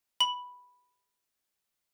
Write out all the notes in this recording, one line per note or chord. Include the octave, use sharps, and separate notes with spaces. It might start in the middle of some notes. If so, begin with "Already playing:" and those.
B5 F#7